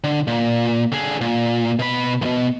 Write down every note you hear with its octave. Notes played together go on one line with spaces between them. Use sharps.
D3
A#2
D3 G#4
A#2
B2 B5
B1 B2